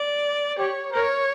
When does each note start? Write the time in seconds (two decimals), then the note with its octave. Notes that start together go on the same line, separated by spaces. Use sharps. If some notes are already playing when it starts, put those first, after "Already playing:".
Already playing: D5
0.58 G4 C#5
0.92 A#4 C#5